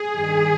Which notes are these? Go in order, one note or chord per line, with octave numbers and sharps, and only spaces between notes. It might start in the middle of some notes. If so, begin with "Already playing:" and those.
Already playing: G#4
G2 D#3